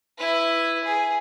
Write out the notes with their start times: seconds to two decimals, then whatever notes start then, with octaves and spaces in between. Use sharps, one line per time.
0.18 E4 B4
0.84 G#4